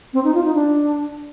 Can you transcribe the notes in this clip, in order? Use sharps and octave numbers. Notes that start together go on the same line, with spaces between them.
C4
D#4
F4
D#4
D4